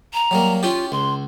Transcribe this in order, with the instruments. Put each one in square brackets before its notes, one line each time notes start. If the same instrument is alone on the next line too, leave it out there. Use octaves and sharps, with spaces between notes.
[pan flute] A#5
[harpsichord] F#3 G3 A#3
[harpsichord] C#4 G4 [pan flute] F4
[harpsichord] C#2 [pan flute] C6